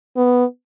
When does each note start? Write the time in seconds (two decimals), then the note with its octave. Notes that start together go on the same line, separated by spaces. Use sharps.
0.17 B3